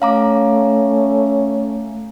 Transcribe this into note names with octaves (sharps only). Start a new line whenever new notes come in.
A3 C#4 F5 A#5 D6